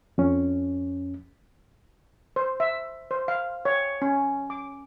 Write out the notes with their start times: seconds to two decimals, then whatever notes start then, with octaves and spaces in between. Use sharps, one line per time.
0.18 F2 C#4
2.36 C5
2.60 E5
3.11 C5
3.28 F5
3.65 C#5
4.02 C#4
4.50 D6